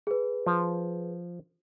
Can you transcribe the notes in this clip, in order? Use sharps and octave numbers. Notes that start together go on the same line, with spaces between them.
G#4 B4
F3